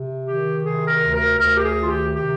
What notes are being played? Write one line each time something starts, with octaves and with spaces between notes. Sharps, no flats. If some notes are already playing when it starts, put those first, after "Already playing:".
Already playing: C3
D#3 G4
C3 G#4
A#4
D2
A#4
D2 A#4
G4
G#4
D#3
F4
G4
C3 G4